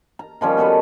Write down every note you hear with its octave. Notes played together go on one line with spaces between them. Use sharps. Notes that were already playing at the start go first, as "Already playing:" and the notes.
A#5
D#3 F3 G3 C#4
B3 F#4 A4 B4